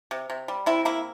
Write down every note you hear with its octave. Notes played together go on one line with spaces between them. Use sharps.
C3
C3
G3
C3 E4
A#3 E4